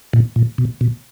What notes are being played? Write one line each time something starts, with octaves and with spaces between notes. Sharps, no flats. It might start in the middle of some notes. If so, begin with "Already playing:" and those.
A#2
A#2
B2
B2